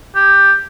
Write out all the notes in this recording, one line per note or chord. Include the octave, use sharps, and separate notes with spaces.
G4